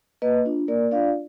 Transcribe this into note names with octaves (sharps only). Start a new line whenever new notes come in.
A#3 B4 D#5
D4 F4
A#3 A#4 D5
D4 F4 D5 F5